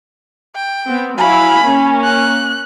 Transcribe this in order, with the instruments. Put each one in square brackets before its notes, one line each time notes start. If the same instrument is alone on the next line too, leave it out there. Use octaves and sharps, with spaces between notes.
[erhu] G5
[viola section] B3 C4
[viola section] F#3 E4 F5 [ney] G#5 [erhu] B5
[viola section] A#3 C#4
[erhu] F#6